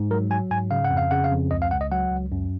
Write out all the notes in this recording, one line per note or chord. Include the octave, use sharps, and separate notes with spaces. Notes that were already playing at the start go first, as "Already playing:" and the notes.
Already playing: G#2
F#3 A#4
F#3 G#5
G#2 G#5
C#3 F5
F#5
F2
F5
C#3 F#5
F5
F2
C#2 D#5
F5
C#2 F#5
D#5
F#3 F#5
C#2
F#2